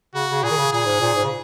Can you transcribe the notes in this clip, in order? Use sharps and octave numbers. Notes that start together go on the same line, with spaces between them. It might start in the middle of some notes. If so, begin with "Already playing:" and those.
C#3 F#4
C#3
A#2 G#4
D#3
C#3
A#2 G#4
G#2
A#2
G#2
C#3